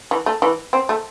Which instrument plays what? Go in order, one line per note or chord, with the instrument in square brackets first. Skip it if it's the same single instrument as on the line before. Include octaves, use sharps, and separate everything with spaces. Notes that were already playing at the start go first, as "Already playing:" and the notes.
[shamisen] E3
A3
E3
C4
A3